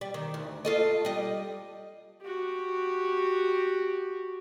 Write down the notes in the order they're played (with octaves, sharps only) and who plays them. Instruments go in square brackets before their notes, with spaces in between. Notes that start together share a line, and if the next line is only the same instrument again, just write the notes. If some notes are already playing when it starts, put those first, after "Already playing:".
[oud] G3
D#3
D2
F4 A4 D#5
G3 D#5
[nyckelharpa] F#4 G4